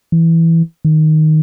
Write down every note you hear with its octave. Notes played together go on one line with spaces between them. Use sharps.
E3
D#3